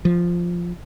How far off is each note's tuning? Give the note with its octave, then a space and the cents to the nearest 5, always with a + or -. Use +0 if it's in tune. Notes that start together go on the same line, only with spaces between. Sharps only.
F3 +0